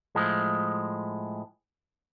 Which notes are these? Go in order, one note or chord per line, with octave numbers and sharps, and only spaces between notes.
A2 F3 G#3